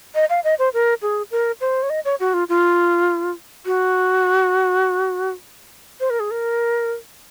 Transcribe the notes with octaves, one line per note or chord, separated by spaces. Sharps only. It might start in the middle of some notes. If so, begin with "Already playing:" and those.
D#5
F5
D#5
C5
A#4
G#4
A#4
C5
C#5
D#5
C#5
F#4
F4
F4
F#4
C5
A#4
G#4
A#4